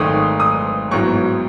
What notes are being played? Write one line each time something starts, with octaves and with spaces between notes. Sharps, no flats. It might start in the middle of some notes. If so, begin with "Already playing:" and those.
Already playing: G#1 G#2 D#3 A3 D#6
D#6
A1 G#2 F#3 B3 C#6